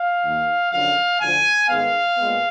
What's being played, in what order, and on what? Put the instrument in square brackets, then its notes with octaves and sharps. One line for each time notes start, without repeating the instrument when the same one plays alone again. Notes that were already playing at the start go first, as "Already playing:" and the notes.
Already playing: [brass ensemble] F5
D#2 D#3 A#3
F#2 D3 F3 F5
D2 D3 F3 G#5
G#2 D#3 G#3 B3 F5
A#2 G#3 B3